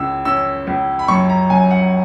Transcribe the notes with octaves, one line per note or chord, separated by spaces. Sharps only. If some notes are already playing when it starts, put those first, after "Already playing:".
Already playing: C#2 C#3 E6
C#4 E6
C#2
B5
F#2 C#6
A#5
F#2 G#5
F#5